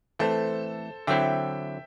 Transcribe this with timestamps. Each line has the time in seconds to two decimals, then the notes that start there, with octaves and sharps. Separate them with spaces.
0.19 E3 A3 C4 A4 C5
1.07 D3 F#3 C4 E4 E5 G5